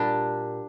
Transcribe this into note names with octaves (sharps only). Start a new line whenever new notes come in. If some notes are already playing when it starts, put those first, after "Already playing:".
Already playing: A#2 G3 D4